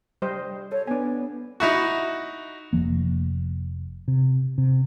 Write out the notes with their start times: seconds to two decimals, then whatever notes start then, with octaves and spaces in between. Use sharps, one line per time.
0.22 G3 C5 D#5
0.72 A4 C#5
0.87 B3 D4 G#5
1.60 D#4 E4 F#4
2.73 F1 E2 F3 A#3
4.08 C3
4.58 C3